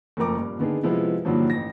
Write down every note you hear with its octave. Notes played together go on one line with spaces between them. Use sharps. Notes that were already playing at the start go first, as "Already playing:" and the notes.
F#1 F2 A3 A#4 A#5 D6
G2 A#2
D3 D#3 B3 D4 G#4
C3 F3 G#3 B3 E4
G2 A#2 D3 D#3 F3 F#3
A1 A#6